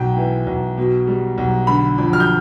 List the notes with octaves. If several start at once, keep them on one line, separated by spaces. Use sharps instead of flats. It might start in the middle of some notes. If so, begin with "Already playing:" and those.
Already playing: B1 G5
E3
B1
B2
G3
B1
D3 B5
F2
F6
G6